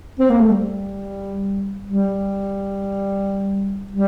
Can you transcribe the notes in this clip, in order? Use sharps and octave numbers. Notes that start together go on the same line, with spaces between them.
C4
A#3
A3
G3
G3
G3